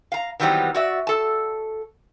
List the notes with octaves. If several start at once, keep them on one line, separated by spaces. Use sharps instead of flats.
F5 A#5
D#3 E3 F#3 G3 B3 C4
F#4 D5 E5
A4 A5